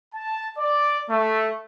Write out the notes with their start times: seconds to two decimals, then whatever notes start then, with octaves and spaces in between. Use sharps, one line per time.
0.14 A5
0.58 D5
1.10 A3